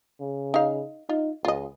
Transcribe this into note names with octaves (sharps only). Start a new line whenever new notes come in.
C#3
D#4 F5
D#4 F4
C#2 F4 D#5